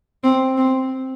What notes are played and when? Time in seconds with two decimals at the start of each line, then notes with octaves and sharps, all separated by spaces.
0.24 C4
0.57 C4